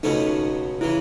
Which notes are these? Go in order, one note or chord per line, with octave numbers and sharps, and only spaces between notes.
C#2 B2 F#3 A3 C#4 D#4
C#3 E3 E4